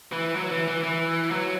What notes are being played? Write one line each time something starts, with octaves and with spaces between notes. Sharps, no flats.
E3
F#3
E3
E3
E3
F#3